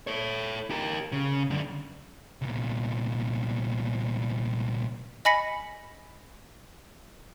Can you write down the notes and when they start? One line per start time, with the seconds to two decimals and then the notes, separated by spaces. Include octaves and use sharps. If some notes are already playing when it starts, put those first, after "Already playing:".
0.07 A4 C#5
0.70 G4 A#4
1.12 C#3
1.50 F#2 D3
2.42 C2 A#2
5.25 D#5 G#5 B5 A#6 B6 C#7